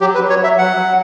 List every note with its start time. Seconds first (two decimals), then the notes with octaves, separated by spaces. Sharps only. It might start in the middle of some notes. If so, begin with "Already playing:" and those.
0.01 F#3 G4
0.15 B4
0.21 F#3
0.30 C#5
0.40 F#3 E5
0.58 F#3 F#5
0.77 F#3